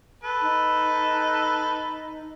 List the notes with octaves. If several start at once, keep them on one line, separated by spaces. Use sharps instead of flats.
A4 B4
D#4